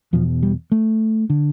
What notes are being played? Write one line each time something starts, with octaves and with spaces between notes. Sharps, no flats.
E2 B2 F3
G3
A3
D3